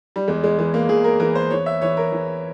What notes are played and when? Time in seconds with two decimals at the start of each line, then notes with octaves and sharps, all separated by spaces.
0.16 G3
0.28 E2 G#3
0.44 G#3
0.58 E3 G#3
0.74 A#3
0.89 E2 G#4
1.04 A#4
1.20 E3 A#4
1.35 C5
1.51 E3 C#5
1.66 E5
1.81 E3 C#5
1.97 A#4
2.12 E3